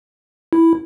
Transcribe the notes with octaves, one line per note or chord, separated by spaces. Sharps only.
E4